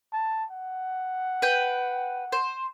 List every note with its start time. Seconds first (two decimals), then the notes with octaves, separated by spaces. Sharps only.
0.13 A5
0.51 F#5
1.42 B4 G5
2.32 C5